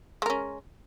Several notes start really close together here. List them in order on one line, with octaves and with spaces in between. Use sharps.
G#3 A#4 C#4